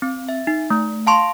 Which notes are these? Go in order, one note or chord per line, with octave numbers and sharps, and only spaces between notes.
C4
E5
D#4
A3
F5 A5 C6 C#6